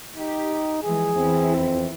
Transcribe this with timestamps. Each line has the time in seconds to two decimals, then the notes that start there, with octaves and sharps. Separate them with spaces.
0.16 D#4 G4
0.83 E3 F3 G#3 G#4
1.17 E2 E3 C4 E4
1.56 F2